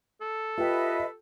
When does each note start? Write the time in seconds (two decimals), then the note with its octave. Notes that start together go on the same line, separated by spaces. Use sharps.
0.21 A4
0.58 F4 G4 B4 D#5 E5 G5